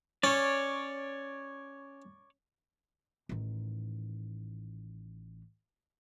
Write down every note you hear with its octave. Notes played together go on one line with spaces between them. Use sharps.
C#4 C#5 D5
A1 D#3